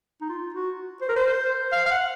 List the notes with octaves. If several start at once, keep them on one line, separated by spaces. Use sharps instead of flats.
D#4
F4
F#4
C5
A#4
C5
F5
F5
F#5